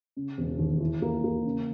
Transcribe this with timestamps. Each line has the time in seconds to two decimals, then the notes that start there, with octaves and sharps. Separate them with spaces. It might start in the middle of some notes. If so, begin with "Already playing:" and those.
0.17 C#3
0.38 E1
0.59 D#2
0.80 E4
1.02 A#3
1.24 A#3
1.45 C#3